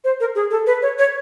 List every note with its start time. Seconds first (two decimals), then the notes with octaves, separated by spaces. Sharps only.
0.04 C5
0.20 A#4
0.35 G#4
0.51 A4
0.67 B4
0.82 C#5
0.99 C#5